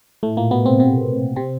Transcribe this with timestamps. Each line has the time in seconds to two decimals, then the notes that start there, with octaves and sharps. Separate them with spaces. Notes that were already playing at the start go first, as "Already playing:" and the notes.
0.23 A2 A3
0.37 A#2 A#3
0.51 B2 B3
0.65 C3 C4
0.79 C3 C4
1.36 C3 C4